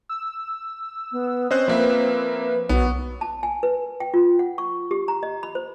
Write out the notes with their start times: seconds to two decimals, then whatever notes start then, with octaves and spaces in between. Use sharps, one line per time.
0.09 E6
1.12 B3
1.51 C4 C#4 C5 D#5 F#6
1.68 F3 A#3 B4 E5
2.69 B1 F#3 B3
3.21 A5
3.43 G#5
3.63 B4
4.00 G5
4.14 F4
4.39 F#5
4.58 C#6
4.91 G4
5.08 A#5
5.23 D#5
5.43 B5
5.55 C5